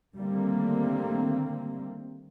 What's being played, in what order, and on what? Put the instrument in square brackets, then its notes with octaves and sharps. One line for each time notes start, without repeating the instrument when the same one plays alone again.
[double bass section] D3 D#3 G3 A3 A#3 C4